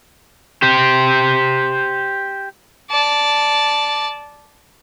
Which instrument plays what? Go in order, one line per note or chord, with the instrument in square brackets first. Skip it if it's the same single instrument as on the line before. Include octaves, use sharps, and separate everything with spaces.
[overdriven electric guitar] G4 C5
[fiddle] D5 A5